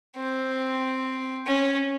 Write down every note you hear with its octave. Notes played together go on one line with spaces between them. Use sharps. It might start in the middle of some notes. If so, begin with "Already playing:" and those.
C4
C#4